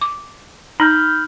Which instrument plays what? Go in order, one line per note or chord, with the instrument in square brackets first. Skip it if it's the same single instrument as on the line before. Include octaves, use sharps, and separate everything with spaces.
[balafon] D6
[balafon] D#4 [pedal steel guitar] B5 F6 G6